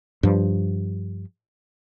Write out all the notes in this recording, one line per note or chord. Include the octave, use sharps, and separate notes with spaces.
G2 F3